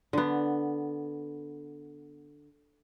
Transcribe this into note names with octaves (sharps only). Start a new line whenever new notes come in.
D3 B3